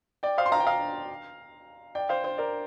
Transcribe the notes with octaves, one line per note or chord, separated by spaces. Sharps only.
D5 G5
C5 F5
C6
F5 A#5
G5
F5 A#5
D5 G5
C5 F5
C5
A#4 D5